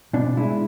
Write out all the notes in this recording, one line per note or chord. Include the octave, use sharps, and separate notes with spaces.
B2 D4
G#3 E4